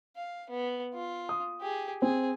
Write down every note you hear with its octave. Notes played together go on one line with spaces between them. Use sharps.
F5
B3
F4
D#6
G4 G#4
C4 G#4